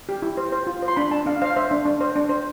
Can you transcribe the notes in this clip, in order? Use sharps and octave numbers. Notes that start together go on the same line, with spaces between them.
G4
E4
C5
C5
F4
C5
C6
D4 B5
D4 A5
D4 F5
C5 F5
C5 E5
D4
D4
C5
D4
C5